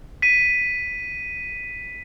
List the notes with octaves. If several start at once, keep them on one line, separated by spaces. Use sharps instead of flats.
B6 D#7